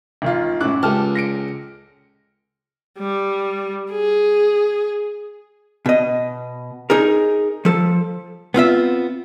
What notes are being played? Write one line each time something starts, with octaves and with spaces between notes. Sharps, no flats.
G#1 D#3 F4
F#2 A2 E4 D6 F#6
C#2 G4 A4 A5 F6
A#6 C#7 D7
G3
G#4
B2 D#5
D#4 G#4 A#4
F3 A4
B3 C4 F4 E5